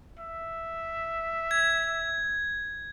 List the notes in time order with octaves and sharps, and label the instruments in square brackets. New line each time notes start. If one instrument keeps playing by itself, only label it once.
[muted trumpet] E5
[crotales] G#6